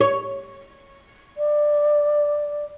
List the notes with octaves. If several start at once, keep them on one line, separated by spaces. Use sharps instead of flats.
C#5
D5